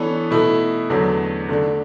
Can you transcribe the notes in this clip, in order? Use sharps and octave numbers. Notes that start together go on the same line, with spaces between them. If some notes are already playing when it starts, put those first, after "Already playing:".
Already playing: E3 B3 D4 A4 C#5
B2 A3 E4
E2 D3 F#3 A3
D3 A3 D4